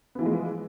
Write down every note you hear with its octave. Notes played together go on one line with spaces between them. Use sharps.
E3 F3 G#3 B3